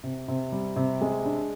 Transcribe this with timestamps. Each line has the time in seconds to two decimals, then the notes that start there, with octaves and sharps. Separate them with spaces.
0.04 C3
0.28 C3
0.52 G3
0.76 C3
1.01 G#3
1.25 D4